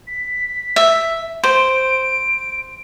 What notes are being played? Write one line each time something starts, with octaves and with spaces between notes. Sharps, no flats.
B6
E5
C5 D7